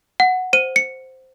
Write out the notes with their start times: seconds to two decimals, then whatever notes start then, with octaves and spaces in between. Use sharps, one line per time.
0.20 F#5
0.53 C5 D#7
0.76 C#7